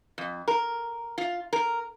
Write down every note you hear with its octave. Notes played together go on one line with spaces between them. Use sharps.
F2
A#4
F4
A#4